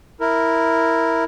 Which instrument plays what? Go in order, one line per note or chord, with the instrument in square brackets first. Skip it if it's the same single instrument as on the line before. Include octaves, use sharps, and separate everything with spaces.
[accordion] E4 A#4